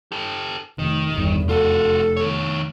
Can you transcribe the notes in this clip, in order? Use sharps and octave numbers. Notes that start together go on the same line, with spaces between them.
G4 A4
F1 D#3
G1 E2
F1 F4 F#4 A4
D#3 C#5